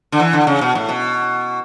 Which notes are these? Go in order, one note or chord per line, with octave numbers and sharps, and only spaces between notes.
D3
E3
D3
C#3
B2
A2
B2